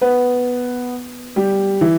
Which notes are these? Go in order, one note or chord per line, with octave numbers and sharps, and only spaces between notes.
B3 B4
G3 G4
E3 E4